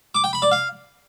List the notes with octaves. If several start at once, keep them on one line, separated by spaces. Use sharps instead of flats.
D6
G5
B5
D5
F5